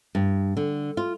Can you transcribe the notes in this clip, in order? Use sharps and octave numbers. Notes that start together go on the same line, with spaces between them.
G2
D3
F4